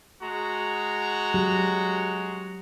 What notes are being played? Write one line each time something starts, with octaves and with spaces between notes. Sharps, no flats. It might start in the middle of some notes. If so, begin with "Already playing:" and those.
G#3 F#4 A#5
F#3 G4